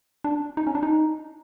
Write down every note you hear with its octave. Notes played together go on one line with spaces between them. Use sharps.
D4
D#4
C#4
D4
D#4